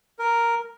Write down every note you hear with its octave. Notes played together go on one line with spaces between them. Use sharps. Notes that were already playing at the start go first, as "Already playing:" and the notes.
A#4